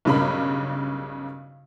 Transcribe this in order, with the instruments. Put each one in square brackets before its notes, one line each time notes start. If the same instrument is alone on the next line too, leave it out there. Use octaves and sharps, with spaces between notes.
[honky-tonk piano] B1 G2 C#3 A#4 B5